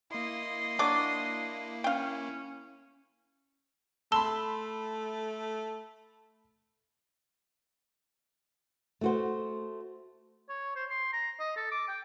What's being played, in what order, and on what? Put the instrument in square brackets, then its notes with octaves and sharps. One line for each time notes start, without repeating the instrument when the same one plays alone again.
[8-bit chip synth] A#3 E4 [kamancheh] D#5 C6
[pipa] F#3 D4 [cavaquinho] D6
[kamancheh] C#4 [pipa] F5 G5
[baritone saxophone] A3 [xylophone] A5 G7 [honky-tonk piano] B5 C6 E6
[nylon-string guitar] A3 F#4 C5
[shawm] C#5
C5
C6
A#5
D#5
A4
D6
G5